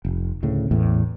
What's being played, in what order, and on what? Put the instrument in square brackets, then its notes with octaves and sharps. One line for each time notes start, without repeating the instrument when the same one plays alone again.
[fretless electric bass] F1
D2 A2 C#3
A1 E2 A2